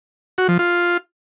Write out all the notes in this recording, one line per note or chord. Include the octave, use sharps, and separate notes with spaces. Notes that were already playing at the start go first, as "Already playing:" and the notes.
F#4
F3
F4